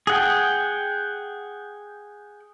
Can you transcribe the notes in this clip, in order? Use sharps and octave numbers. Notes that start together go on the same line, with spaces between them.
G#4 F#5 G5